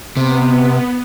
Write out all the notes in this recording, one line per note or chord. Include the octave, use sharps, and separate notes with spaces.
C3 B3